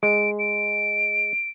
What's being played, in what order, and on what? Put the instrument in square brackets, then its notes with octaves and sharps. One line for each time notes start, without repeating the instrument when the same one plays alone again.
[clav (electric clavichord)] G#3 [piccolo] D7
[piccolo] D7